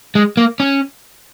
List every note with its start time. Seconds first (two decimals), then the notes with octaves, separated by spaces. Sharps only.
0.15 G#3
0.37 A#3
0.60 C#4